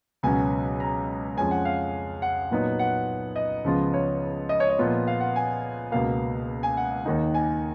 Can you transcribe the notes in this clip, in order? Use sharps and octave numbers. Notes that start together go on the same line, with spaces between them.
C#2 B2 F#3 C#4 G#5
A#5
F2 F3 G#3 C#4 G#5
F#5
F5
F#5
A#2 F#3 B3 D#4
F#5
D#5
C#2 C#3 F3 B3 F4
C#5
D#5
C#5
D#5
A#2 F3 B3 F4
F5
F#5
G#5
C#2 B2 A#3 F5
G#5
F#5
D#2 D#3 A#3 D#4
G#5